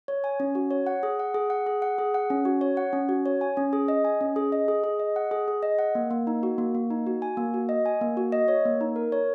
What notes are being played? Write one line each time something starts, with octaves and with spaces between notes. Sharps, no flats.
C#5
G#5
C#4
F#4
C#5
F#5
G#4
F#5
G#4
F#5
G#4
F#5
G#4
F#5
C#4
F#4
C#5
F#5
C#4
F#4
C#5
G#5
C#4
G#4
D#5
G#5
C#4
G#4
D#5
G#4
G#4
D#5
F#5
G#4
G#4
D#5
F#5
A#3
A#3
D#4
F#4
A#3
A#3
D#4
F#4
G#5
A#3
F#4
D#5
G#5
A#3
F#4
D#5
C#5
A#3
D#4
A#4
C#5